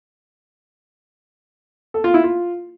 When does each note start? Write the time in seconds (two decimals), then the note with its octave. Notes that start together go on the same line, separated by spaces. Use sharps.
1.94 A4
2.04 F4
2.14 E4
2.24 F4